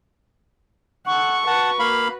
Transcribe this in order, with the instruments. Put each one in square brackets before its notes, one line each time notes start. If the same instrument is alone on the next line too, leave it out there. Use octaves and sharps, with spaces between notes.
[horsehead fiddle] A4 F#5 [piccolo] C#6
[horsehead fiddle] F#4 B4 [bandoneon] F#5 A5
[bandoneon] A#3 F5 B5